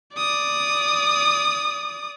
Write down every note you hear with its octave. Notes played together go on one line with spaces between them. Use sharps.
D5 D#6